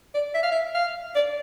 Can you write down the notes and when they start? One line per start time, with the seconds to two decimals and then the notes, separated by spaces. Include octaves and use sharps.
0.15 D5
0.35 E5
0.43 F5
0.51 E5
0.75 F5
1.15 D5